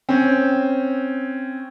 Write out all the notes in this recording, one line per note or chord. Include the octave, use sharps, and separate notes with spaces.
C4 C#4